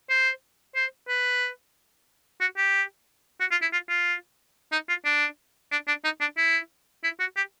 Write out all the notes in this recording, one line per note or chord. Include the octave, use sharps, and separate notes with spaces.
C5
C5
B4
F#4
G4
F#4
F4
E4
F4
F4
D#4
F4
D4
D4
D4
D#4
D4
E4
E4
F#4
G4